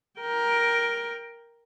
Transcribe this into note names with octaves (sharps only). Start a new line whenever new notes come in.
A#4 G5